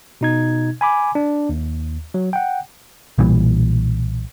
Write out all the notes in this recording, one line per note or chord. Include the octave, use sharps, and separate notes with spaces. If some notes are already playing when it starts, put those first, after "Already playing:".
B2 D#4 G#6
G#5 B5 D6
D4
D#2
F#3
F#5 G5
B1 A#2 E3 G3